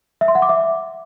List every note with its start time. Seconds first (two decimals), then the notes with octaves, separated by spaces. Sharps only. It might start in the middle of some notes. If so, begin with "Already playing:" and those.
0.21 E5
0.28 C6
0.35 F#5
0.42 D6
0.49 E5